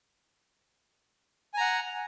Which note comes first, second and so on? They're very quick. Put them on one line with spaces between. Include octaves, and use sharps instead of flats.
G#5 A#5 F#5